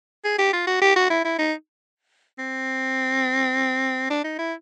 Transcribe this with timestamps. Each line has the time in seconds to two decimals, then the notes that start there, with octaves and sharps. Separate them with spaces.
0.25 G#4
0.39 G4
0.53 F4
0.67 F#4
0.82 G4
0.96 F#4
1.10 E4
1.25 E4
1.39 D#4
2.39 C4
4.10 D4
4.24 D#4
4.39 E4